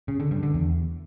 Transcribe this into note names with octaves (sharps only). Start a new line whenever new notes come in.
C#3
D3
G2
D3
E2